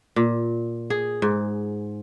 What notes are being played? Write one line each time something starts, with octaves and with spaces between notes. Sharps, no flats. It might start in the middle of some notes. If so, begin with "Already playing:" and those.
A#2
G#4
G#2